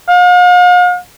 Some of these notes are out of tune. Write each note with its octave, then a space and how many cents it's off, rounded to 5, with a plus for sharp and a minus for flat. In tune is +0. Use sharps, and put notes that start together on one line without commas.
F5 +45